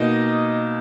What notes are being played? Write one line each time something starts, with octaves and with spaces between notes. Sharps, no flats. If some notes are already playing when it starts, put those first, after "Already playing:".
Already playing: B2 A#3 D#4 D#5